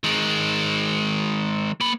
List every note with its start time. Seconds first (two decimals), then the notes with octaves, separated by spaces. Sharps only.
0.04 D#3 G#3
1.80 A#3 B5